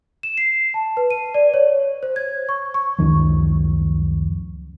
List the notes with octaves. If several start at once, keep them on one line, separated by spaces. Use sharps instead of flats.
E7
C7
A5
B4
D#7
D5
C#5
C5
G#6
C#6
C#6
C#2 F#2 D#3 F3